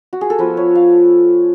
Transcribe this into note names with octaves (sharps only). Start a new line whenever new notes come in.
F#4
G#4
A4
F3 B3 F4 B4
C#5
F5